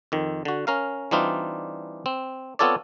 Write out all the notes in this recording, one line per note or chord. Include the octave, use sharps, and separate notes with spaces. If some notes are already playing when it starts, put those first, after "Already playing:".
F2 D#3
D3 F#4
C#4 A#4 F5
E3 G3 C4 D4 D#4 F4
C4
B3 C4 F4 A4 C#5 D5